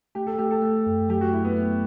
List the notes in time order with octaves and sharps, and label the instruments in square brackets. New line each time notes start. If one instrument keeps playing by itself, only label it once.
[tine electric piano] A3 [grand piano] G4
[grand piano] A4
[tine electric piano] A3 [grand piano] G4
[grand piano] A4
[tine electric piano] A3
F#2
[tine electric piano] F#3 [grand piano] G4
[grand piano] F#4
[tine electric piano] A3 [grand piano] E4
[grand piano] B3
[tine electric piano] A3